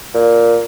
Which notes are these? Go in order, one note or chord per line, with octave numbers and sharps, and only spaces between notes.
A#2